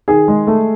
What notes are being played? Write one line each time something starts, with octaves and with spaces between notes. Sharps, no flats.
D#3 G#4
G#3
A3